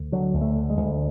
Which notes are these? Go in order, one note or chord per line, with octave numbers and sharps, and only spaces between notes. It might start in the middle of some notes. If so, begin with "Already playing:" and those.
Already playing: D2
D3 F#3
D2
A3
D3
G#3
D2